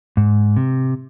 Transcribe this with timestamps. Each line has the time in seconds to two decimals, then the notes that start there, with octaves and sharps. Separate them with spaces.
0.17 G#2
0.56 C3